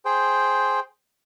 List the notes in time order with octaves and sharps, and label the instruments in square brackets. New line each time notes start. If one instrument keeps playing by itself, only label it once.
[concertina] G#4 C5 G5